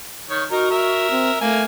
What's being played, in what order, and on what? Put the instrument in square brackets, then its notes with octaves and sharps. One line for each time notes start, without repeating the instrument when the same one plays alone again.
[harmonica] D#3 C#5
[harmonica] D#4 A#4 [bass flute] F#4
[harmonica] A#4 E5
[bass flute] C4
[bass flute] A3 [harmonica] A#3 G#5